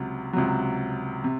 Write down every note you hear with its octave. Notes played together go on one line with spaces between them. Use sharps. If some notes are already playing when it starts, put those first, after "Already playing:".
Already playing: C#2 C3 F#3
C#2 C3 F#3
C3